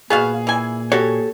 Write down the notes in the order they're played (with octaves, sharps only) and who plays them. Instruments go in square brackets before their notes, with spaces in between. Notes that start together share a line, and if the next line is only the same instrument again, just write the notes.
[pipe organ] A#2 [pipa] B3 F#4 F5 [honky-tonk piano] G#4
[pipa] E3 G#5
[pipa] F#4 [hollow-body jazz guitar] G4 A4 C#5